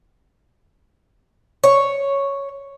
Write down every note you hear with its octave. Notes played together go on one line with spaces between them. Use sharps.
C#5